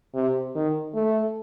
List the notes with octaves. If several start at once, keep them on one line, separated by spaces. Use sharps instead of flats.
C3
D#3
A3